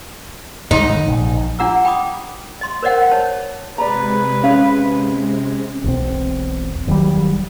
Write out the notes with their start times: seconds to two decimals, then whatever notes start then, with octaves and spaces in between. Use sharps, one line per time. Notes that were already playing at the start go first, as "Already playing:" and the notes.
0.71 G#2 D3 D#4
0.90 D3 D#3
1.08 A#1
1.59 D4 F4 F#5 A#5 D6 E6
1.85 G5 B5 D6 D#6
2.61 D#5 C6
2.82 A#4 C5 D5 D#5 F#5 G5
3.11 C5 C#5 A5
3.78 C3 G#3 B4 D5 A#5
4.43 C#4 C#5 E5 F5
5.84 E1 B1 C4
6.87 E1 D#3 F#3 G3